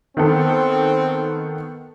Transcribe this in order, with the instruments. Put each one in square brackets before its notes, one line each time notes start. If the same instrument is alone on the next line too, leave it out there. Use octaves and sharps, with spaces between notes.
[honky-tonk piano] D#3 B3 A4 [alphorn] C4